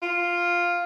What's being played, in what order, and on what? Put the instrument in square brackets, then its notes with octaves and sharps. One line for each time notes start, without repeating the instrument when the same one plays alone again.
[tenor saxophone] F4